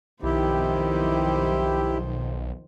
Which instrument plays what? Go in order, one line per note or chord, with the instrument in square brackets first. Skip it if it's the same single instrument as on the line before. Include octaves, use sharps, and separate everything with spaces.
[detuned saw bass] B1 [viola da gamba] F2 D#3 C5 [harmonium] E4 G4